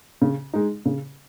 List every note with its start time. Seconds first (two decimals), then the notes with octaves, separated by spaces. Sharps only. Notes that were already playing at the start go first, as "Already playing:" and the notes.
0.22 C#3
0.53 G#3 D#4
0.85 C#3